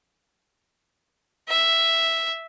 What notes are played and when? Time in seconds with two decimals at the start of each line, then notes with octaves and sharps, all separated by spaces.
1.49 E5